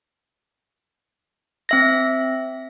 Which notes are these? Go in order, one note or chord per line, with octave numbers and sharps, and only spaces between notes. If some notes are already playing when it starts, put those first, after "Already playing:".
C4 E5 A#6